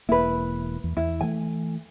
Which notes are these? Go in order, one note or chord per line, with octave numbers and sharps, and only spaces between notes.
E1 A#3 E4 B4
E2
E2 E4
E3 A3 G#5